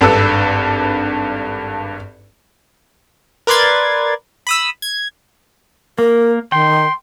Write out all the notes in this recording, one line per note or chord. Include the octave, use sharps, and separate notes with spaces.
G#1 G2 D4 A4 B4 E6
A#4 B4 D5 C6 G#6 A6
B5 D#6 E6
G#6
A#3 A#4
D#3 G5 C6